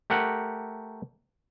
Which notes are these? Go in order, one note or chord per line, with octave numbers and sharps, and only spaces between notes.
A3 G4 A#4 F#5